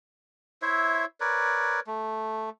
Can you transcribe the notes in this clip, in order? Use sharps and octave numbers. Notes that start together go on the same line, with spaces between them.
E4 C5 C#5 E5
A#4 B4 C#5 D5
A3